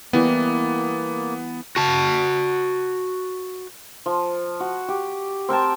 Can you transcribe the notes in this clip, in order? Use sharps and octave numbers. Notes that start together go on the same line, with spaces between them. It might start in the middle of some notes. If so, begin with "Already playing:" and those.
E3 G3 A#3 B3 G4
F#4 A5
F3
F#4
G4
C4 A#4 G5 A5